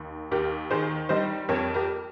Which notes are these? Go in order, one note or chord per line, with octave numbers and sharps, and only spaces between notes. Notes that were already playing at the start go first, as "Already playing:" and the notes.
Already playing: D#2
D#2 G4 A#4
D#3 G#4 C5
G3 C5 D#5
F2 A#4 C#5
G4 A#4